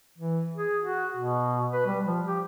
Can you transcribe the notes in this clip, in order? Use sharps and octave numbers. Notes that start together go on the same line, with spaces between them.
E3
G#4
F#4
B2
B4
G3
F3
G4